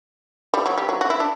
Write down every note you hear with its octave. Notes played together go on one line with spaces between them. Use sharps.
G3
F#3
G3
F#3
F#4
E4
D4